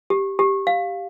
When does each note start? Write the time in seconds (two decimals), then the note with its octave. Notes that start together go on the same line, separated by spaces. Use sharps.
0.10 G4
0.39 G4
0.67 F5